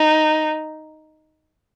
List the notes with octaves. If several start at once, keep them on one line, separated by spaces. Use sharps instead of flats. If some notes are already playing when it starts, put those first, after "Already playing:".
Already playing: D#4